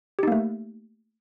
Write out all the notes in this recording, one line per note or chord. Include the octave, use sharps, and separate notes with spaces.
A3 A#3 D#4 G4